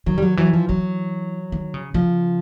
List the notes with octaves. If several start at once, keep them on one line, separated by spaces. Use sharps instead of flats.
D#3 F#3
G3
F#3
E3 F#3
F3
E3 F#3
D#3
C#3
C#3 F3